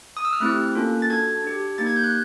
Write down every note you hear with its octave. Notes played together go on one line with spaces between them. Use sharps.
D#6
E6
F6
A3 C4 E4 G4 F#6
A#3 C#4 F4 A4
A6
D4 F#4 A4 G#6
D4 G4
A#3 D#4 G4 A6
G#6
G6
F#6